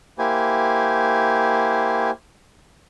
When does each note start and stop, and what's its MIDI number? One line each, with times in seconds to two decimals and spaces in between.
0.19 2.11 58
0.19 2.11 64
0.19 2.11 67
0.19 2.11 72
0.19 2.11 80